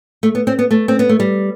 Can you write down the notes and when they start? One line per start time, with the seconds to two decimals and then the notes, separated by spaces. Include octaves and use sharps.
0.23 A3
0.35 B3
0.47 C4
0.59 B3
0.71 A3
0.88 C4
0.99 B3
1.09 A3
1.20 G3